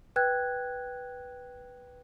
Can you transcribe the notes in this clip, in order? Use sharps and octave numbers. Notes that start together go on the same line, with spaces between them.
B4 G5 F#6 G#6